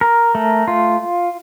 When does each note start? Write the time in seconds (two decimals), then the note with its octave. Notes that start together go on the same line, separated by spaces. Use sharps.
0.01 A#4
0.35 A3
0.68 F4